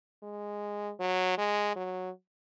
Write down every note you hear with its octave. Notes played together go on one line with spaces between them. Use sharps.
G#3
F#3
G#3
F#3